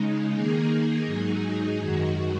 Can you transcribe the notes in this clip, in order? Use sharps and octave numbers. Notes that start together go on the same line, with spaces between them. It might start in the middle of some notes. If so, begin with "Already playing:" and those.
Already playing: C#3 G#3 D#4
D#3 A#3 D#4 G#4
G#2 F#3 D#4 G#4
F#2 D#3 G#3 F#4